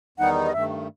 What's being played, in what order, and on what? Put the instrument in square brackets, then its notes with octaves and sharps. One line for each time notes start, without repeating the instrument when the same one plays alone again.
[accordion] E2 D#3 G3 B3 D#4 [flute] F#5
[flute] D#5
[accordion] G2 D#3 A3 [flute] E5